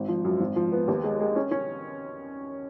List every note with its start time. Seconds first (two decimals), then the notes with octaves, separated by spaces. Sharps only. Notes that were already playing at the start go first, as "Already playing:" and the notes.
Already playing: G#1
0.08 F3
0.25 F#2
0.40 G#1
0.56 F3
0.72 B3
0.88 D#2
1.04 G#3
1.20 G#3
1.36 C#4
1.51 C#4